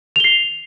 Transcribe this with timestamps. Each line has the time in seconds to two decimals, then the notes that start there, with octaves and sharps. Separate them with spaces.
0.16 F7
0.20 G7
0.24 C7